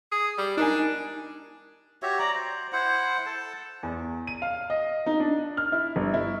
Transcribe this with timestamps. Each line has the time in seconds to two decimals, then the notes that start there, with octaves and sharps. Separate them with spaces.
0.12 G#4
0.38 G3
0.57 D4 D#4 A#4 G#5
2.02 F#4 G4 C#5 E5
2.19 D5 A#5
2.35 C5
2.72 E4 C5 F#5
3.26 A4 A5
3.83 E2
4.27 D#7
4.42 F5
4.70 D#5
5.06 D#4
5.20 D4
5.57 F6
5.72 E4
5.96 G1
6.14 E4